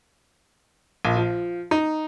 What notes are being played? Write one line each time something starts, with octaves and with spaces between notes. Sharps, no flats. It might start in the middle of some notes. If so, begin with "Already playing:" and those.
A#1
F3
D#4